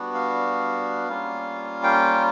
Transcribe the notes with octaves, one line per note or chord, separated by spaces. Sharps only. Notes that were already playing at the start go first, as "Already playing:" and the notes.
Already playing: G3 B3 D4 F#4
F5
G3 A#3 C#4 F4
G5